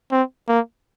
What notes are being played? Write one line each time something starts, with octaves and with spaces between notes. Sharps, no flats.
C4
A#3